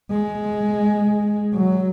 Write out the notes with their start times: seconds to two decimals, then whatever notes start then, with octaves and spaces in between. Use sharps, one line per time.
0.11 G#3
1.54 F#3